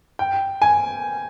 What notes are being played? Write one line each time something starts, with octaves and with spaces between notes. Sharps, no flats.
G5
G#5